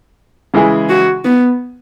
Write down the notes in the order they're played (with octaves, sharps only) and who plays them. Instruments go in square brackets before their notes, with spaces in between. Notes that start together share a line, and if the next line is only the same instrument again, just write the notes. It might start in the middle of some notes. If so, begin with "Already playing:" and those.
[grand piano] C#3 E3 G#3 E4 G#4
[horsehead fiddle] F#4
B3